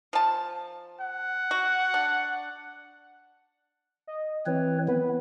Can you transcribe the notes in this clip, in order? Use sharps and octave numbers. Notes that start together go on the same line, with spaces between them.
F3 A5
F#5
F#4
D4
D#5
E3 C4 B4 C#5
B3 B4